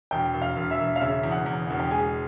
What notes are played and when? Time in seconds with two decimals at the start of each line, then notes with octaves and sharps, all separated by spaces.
0.11 E1 G5
0.34 E1
0.42 F5
0.56 E1
0.71 E5
0.79 E1
0.96 F5
1.01 C#3 E5
1.23 E2
1.32 F#5
1.46 E2
1.67 E1 F#5
1.80 G5
1.91 G#3 G#5